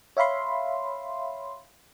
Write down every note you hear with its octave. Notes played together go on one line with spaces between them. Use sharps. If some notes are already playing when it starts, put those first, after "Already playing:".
C#5 E5 F5 B5 C6